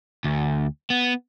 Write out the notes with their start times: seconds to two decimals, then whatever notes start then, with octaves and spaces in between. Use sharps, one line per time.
0.24 D2
0.90 B3